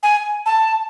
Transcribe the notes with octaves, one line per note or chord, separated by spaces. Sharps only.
G#5
A5